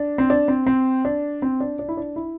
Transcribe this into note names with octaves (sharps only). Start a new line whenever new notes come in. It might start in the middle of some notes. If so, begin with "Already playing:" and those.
Already playing: D4
C4
D4
C4
C4
D4
C4
D4
D4
E4
D4
E4